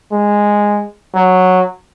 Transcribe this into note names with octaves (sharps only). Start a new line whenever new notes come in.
G#3
F#3